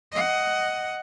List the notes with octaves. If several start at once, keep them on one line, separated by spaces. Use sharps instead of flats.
D#5 F#5